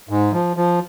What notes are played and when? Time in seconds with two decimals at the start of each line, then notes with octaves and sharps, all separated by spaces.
0.09 G#2
0.32 F3
0.57 F3